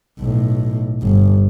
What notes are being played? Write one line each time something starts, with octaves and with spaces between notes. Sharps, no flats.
B1 A2
G1